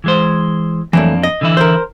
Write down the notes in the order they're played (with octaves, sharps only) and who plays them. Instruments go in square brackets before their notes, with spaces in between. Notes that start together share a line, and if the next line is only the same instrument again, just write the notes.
[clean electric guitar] E3 G#3 C5
[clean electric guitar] F2 A#3 D4 [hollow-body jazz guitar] E3 F#3 A3
[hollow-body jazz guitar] D#5
[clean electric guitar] D3 E3 E4
[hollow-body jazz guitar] A#4 C5